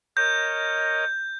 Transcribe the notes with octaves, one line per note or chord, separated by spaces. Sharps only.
A#4 C#5 D#5 G6